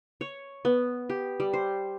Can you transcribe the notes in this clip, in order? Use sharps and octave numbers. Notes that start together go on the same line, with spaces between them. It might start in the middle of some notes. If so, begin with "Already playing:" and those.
C#5
B3
G4
G3
C5